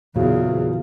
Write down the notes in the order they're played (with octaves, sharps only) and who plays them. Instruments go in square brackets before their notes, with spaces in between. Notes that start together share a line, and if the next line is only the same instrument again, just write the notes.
[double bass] E2 [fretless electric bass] A#2 E3 [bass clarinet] C#3 [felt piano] F#3